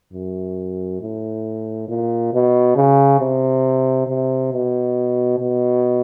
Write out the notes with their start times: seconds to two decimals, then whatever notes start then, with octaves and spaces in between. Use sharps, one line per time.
0.13 F#2
1.01 A2
1.88 A#2
2.33 B2
2.76 C#3
3.20 C3
4.07 C3
4.52 B2
5.39 B2